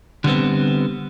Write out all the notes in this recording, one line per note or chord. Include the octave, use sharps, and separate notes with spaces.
D3 G3 B3 C4